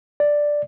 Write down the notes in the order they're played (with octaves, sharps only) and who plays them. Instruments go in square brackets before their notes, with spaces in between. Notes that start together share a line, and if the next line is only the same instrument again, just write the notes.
[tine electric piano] D5